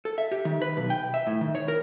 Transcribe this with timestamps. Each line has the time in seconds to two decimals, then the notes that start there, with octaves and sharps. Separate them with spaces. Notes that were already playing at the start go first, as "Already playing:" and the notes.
0.05 A4
0.18 E5
0.32 G4
0.45 D#3
0.62 B4
0.77 B1
0.90 G5
1.14 E5
1.27 A2
1.41 D#3
1.55 C#5
1.68 A#4